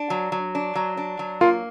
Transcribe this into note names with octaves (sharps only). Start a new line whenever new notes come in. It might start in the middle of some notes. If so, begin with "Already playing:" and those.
Already playing: D4
F#3
F#3
D4
F#3
D4
F#3
A#3 F4